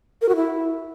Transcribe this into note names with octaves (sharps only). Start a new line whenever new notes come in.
A#4
F#4
E4